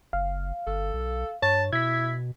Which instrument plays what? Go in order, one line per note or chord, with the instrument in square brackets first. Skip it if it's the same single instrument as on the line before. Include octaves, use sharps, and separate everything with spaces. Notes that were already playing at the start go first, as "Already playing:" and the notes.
[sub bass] F#1 [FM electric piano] F5
[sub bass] G1 [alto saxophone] A4
[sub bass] B1
[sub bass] G2 [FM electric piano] C#5 [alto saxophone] A5
[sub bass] B2 [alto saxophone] E4 [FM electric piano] G#6 B6